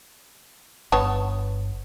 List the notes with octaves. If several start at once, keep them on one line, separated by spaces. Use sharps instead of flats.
G1 B3 C#5 A5